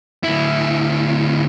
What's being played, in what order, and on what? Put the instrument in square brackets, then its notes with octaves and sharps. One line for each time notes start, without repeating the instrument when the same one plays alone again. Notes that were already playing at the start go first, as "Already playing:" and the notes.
[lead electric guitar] D2 E4